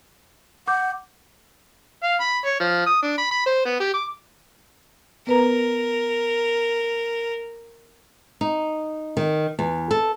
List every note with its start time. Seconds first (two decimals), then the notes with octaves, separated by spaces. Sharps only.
0.68 F#5 D6 G6
2.04 F5
2.20 B5
2.45 C#5
2.60 F3
2.86 D#6
3.02 D4
3.18 B5
3.31 B5
3.46 C5
3.65 B3
3.80 G4
3.94 D6
5.27 B3 A#4 B4 A#5
8.41 D#4
9.17 D#3
9.59 E2
9.91 A4